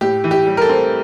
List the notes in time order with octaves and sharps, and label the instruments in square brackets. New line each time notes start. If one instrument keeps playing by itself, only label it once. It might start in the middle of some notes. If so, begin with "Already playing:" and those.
[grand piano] A2 G4
E3
G4
G3
A#4
A4
C4